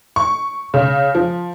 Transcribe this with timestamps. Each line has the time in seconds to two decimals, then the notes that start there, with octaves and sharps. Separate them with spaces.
0.16 C#6
0.74 C#3
1.15 F3